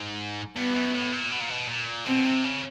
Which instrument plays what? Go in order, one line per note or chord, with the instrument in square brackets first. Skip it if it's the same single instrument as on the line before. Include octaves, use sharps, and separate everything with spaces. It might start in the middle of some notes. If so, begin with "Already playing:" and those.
Already playing: [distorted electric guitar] G#2
[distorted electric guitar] G2 [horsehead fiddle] B3
[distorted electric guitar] F#2
A2
A#2
B2
A#2
B2
A#2
[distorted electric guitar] B2 [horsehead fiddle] C4
[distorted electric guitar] C3
C#3